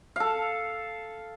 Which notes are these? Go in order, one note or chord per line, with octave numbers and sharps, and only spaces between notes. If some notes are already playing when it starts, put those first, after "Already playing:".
A4 F5